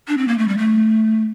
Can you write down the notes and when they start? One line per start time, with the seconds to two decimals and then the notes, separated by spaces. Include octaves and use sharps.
0.08 D4
0.18 C4
0.28 A#3
0.38 A3
0.48 G3
0.58 A3